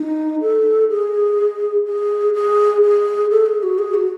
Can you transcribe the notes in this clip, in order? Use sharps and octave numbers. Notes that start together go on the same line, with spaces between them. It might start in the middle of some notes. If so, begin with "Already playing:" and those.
Already playing: D#4
A4
G#4
G#4
G#4
G#4
A4
G#4
F#4
G#4
F#4